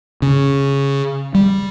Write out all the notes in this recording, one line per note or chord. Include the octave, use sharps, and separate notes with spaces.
C#3
G3